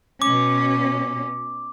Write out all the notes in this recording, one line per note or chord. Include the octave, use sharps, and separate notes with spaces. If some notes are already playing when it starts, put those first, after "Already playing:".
B2 C#4 D6